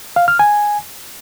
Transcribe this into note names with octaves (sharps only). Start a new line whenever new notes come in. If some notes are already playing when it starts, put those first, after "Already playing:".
F5
F6
G#5